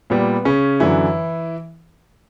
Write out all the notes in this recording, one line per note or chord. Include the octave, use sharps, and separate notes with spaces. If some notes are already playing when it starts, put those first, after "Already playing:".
A#2 G3 B3
C#3 C#4
F#2 D3 E3 F#3 E4